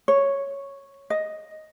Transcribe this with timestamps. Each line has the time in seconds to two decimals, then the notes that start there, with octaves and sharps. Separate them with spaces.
0.08 C#5
1.10 D#5